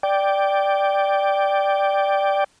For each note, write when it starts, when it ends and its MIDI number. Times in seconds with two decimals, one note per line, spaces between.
0.03 2.44 74
0.03 2.44 79